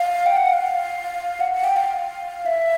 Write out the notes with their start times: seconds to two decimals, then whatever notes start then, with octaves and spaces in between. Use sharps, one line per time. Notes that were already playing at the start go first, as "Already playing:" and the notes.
Already playing: F5
0.26 G5
0.36 F#5
0.53 F5
1.40 F#5
1.53 F#5
1.64 G5
1.76 F5
2.46 E5